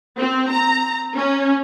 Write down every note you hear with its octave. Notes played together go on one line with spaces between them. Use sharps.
C4
A#5
C#4